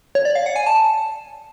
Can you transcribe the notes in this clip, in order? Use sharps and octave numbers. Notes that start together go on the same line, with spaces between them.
C#5
D5
F5
F#5
G#5
A5